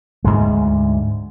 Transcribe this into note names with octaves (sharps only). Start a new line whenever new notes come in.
D2 G#2 G#3